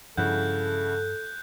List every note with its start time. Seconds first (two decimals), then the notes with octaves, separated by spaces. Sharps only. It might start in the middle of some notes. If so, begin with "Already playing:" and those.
0.17 G2 C#3 F3 E4 A4 F#5 F#6 G6